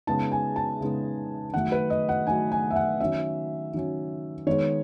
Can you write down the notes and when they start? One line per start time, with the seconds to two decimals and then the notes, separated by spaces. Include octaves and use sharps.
0.07 C#3 G#3 B3 D#4 A5
0.32 G#5
0.56 A5
0.81 C#3 G#3 B3 D#4
1.54 D#3 F#3 A3 F#5
1.72 B4
1.90 D#5
2.09 F#5
2.27 D#3 F#3 A3 G#5
2.52 G#5
2.70 E5
2.76 F#5
3.00 D#3 F#3 C#4 E5
3.74 D#3 F#3 C#4
4.47 D#3 G#3 B3 C#5